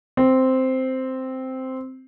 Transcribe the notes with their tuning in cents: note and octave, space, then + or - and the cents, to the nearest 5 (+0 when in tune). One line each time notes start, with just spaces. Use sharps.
C4 -5